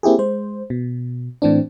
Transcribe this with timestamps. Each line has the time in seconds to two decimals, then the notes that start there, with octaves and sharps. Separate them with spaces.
0.03 A#3 C4 E4 G4 G#4
0.19 G#3 C5
0.70 B2
1.42 A2 E3 C4 D4